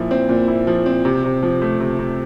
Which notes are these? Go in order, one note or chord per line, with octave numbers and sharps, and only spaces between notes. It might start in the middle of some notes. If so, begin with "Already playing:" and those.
Already playing: A#2 F3 E4
C4
A#2
E4
F3
C4
C3
C3
F3
A3
C3
C3